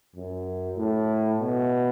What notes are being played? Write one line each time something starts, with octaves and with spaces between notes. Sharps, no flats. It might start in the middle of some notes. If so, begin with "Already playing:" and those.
F#2
A2
B2